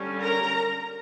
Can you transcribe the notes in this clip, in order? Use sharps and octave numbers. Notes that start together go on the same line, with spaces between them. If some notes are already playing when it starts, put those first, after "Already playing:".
Already playing: D3 G3 C#4
A#4 A#5